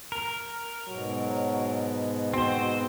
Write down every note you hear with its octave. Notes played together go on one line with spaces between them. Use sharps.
A#4
G#2 B2 F#3
C4 F#4 C5